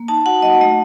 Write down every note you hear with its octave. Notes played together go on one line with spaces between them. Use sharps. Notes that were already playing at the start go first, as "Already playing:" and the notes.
Already playing: A#3
D#4 A5
F#4 F#5
F#3 D#5
A3 D#5